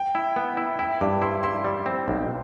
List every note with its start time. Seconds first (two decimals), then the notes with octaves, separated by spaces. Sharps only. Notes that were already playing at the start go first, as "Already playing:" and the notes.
Already playing: G5
0.15 E4
0.36 B3
0.57 E4
0.79 E4 G5
1.01 G2 D6
1.22 E4 C6
1.43 E4 C6
1.64 G3
1.86 C4
2.08 B1